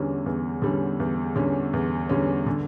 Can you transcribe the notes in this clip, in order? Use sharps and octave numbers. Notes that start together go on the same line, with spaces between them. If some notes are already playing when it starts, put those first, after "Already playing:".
Already playing: E2 D3 G3 C#4
E2
D3 G3 C#4
E2
D3 G3 C#4
E2
D3 G3 C#4
D3